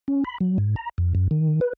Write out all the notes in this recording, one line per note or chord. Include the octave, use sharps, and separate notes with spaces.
C#4
B5
F#3
G#2
A#5
F2
F#2
D#3
B4